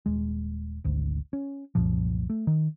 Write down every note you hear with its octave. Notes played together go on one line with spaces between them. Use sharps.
D#1 G#3
G#1 D2
C#4
C2 F#2 A#2 F3
A3
D#3